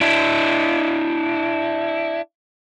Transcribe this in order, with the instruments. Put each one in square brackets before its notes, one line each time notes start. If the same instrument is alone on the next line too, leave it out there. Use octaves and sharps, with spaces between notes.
[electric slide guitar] D4 E4